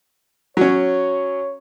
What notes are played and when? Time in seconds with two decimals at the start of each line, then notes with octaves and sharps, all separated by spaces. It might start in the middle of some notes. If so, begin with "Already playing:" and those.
0.57 F#3 C#4 C#5